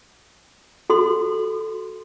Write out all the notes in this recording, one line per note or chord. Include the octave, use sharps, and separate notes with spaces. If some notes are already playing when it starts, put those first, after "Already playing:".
F#4 A4 C6